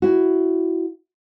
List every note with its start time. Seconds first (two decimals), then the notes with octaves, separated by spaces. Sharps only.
0.02 E4 F#4